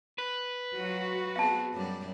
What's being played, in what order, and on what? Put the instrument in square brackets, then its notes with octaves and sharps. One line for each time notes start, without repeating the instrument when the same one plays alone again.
[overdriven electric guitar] B4
[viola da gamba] F#3 F4 [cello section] F#4
[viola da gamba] B3 C4 G#4 [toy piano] F5 A5
[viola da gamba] F#2 G3 D5